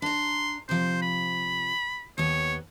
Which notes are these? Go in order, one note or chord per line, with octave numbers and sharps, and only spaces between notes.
D4 A#5 C6
C3 F3 C5
B5
D#2 B3 C#5